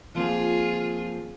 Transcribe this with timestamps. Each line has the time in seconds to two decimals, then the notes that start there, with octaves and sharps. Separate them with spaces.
0.15 F3 A#3 C4 F4 G#4